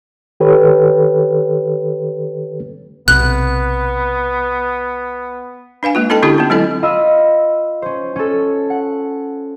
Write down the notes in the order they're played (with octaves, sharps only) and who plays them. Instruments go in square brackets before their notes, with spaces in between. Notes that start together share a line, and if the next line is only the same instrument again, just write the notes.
[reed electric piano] D#3 G4 A4 B4 C#5
[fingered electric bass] B1 C3 [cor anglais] B3 [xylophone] F#6
[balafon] D4 B4 F5 G#5
G#3 A#3 F4
C#4 D#4 A4 D#5 G5 A5
D3 C#4 D4 E4 F4 G4
B3 C#4
F#3 G#3 C4 E4 A4 D#5
[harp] F4 D#5 B5 E6
C#4 C5
C#4 A4
F#5